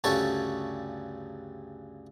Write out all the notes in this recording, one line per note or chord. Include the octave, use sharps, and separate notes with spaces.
D2 G2 C#3 A4 C#5 C#6